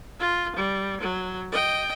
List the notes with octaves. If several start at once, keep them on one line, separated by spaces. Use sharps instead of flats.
F4
G3
F#3
D#5 G5